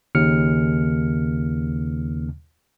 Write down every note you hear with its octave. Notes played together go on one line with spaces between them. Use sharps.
D#2 C#3 F6 C#7